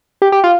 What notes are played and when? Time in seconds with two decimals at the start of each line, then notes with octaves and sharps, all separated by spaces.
0.22 G4
0.32 G4
0.44 F4